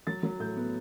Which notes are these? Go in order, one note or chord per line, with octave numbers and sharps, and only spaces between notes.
F#3 A6
F#3
A2 G6
B3